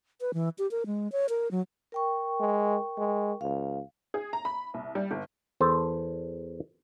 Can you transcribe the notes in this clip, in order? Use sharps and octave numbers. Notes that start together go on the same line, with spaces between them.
B4
E3
G4
A#4
G#3
C#5
A#4
F#3
A#4 G5 C#6
G#3
G#3
C#2 F5
G#4
A#5
B5
C2
G3
G1
E2 A4 C5 A5